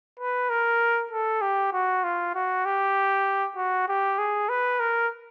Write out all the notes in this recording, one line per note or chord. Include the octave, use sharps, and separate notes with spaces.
B4
A#4
A4
G4
F#4
F4
F#4
G4
F#4
G4
G#4
B4
A#4